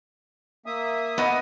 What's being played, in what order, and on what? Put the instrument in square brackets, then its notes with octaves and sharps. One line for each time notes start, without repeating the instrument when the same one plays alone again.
[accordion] A#3 E5 D#6
[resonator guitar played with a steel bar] B3 D#5